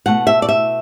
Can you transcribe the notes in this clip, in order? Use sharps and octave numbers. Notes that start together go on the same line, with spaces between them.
B2 A3 F#5
E5
D5
E5